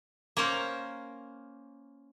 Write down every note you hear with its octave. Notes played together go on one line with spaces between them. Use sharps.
A#3 C#4 A#4 C5